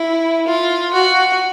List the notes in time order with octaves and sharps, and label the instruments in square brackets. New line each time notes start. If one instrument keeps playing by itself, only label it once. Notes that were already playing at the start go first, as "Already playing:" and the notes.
Already playing: [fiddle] E4
F4
F#4